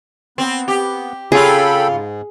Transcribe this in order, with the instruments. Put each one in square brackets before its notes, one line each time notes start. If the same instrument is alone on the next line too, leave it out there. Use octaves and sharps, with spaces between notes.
[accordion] B3 [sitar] C4
[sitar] G4
[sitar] C#3 F4 [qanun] G#4 [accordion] A4 G5 B5
[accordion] G#2